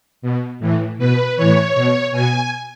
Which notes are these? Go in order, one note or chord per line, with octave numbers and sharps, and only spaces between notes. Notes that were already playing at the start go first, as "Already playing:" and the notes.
B2
A2 E3
B2 B4
A2 E3 C#5
B2
B2 G#5